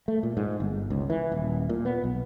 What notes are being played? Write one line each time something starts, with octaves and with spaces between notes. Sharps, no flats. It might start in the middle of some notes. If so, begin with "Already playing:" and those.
A3
A#2
G#2
G1
C#2
E3
D#1
A#2
B3
B1